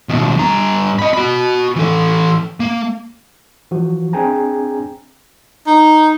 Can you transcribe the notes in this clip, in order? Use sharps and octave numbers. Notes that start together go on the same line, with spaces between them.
D#2 B2
G2 A#5
D#5 B5
F#4 B5
E3 A4
A#3
E3 F3 F#4
C4 D4 G#4 G5 G#5 A#5
D#4